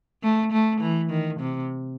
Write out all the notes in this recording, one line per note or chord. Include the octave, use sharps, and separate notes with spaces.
A3
A3
E3
D#3
C3